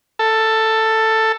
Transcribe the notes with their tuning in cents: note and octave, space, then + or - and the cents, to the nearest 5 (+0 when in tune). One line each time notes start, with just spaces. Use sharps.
A4 +10